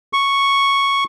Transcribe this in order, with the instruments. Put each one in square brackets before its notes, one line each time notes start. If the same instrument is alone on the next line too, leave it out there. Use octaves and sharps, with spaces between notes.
[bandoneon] C#6